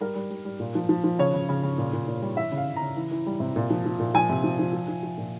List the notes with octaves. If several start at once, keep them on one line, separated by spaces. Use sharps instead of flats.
G3 A#4
G3
G3
G3
A#2
F3
F3
F3
C#3 C#5
C#3
C#3
C#3
A#2
A#2
A#2
G3
E3 E5
C#3
F5
C#3
A#5
C#3
E3
E3
G3
C3
A#2
F3
F3
A#2
F3 G#5
C3
F3
F3
F3
F3
F3
A#2